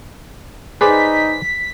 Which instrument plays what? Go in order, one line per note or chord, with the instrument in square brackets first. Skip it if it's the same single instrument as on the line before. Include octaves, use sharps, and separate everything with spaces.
[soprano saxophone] D#4 [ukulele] G#4 [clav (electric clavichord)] B4 C5 D5 [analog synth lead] B6